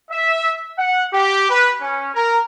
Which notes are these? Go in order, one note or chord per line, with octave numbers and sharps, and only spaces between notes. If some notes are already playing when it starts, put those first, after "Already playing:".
E5
F#5
G4
B4
C#4
A#4